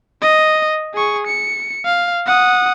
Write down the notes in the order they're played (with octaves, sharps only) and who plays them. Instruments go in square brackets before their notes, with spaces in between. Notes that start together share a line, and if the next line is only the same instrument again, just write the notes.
[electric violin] D#5
G#4 C#6
C#7
F5
F#5 D#6